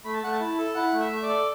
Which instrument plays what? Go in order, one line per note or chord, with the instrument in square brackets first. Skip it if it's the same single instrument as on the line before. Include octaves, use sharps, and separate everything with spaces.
[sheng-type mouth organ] A3 B5
A5
A3 F#5
A5
E4
A4
E4 F#5
A3
E5
A3
D5
A4